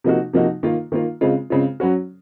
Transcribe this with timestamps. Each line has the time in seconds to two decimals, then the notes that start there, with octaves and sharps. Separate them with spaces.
0.04 C3 F3 A#3 D#4 F#4
0.33 C3 F3 A#3 D#4 F#4
0.63 D#3 A#3 F4
0.92 D#3 A#3 F4
1.21 C#3 G#3 C4 F4
1.50 C#3 G#3 C4 F4
1.80 F#3 C#4 F#4